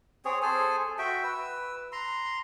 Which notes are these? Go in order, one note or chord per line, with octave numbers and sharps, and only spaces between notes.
C4 G#4 C#5
G#4 A4 C5 G#5
F#4 E5 G5
B4 E6
A#5 C6